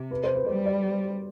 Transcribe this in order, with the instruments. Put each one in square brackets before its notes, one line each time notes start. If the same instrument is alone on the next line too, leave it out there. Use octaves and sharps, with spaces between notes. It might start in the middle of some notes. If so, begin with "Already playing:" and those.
Already playing: [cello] C3
[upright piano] B4
C5
B4
[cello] G3 [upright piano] C5
[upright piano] D5